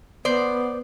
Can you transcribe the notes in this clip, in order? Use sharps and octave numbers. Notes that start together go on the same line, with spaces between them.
B3 C5 D5